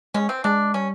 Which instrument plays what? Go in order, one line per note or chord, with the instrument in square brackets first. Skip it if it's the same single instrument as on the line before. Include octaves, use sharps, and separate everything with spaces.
[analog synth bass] G#3 [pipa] C#4
[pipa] C4
[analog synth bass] G#3 [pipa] D4
[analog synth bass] G3 [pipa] C#4